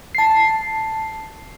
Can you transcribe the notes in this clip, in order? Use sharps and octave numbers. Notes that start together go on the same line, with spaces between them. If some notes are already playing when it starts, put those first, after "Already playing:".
A5 C7